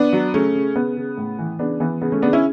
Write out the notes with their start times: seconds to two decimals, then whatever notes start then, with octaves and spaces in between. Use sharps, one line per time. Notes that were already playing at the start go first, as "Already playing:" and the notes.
Already playing: B3 D4
0.13 F#3
0.34 C#3 A3 C#4
0.55 C#3
0.76 C#3 B3
0.97 C#3
1.18 A2
1.39 E3
1.59 C#3 B3 D4
1.80 E3 B3
2.02 C#3 B3
2.12 A3 C#4
2.22 C#3 B3 D4
2.33 C#4 E4